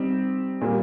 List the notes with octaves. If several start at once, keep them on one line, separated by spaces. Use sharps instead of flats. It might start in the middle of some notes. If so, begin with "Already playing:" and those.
Already playing: G3 C4 D#4 G4
A#2 G3 A#3